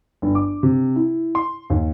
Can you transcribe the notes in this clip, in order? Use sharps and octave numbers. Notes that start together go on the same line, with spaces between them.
G1
D6
C3
E4
C6
D#2